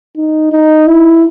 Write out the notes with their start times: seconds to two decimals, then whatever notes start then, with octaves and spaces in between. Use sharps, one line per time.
0.17 D#4
0.52 D#4
0.87 E4